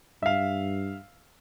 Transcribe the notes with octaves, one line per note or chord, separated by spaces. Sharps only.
G2 E5 F5